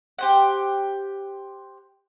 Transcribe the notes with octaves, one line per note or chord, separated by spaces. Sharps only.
G4 C5 F#5